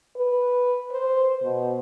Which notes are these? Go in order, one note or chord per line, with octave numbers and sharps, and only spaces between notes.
B4
C5
B2